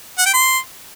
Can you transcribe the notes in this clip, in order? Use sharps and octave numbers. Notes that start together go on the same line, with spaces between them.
F#5
G5
C6